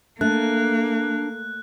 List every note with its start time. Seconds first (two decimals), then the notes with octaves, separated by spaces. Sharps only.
0.21 A3 A#3 D4 F#6